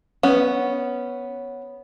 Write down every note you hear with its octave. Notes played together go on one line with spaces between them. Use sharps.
B3 C#4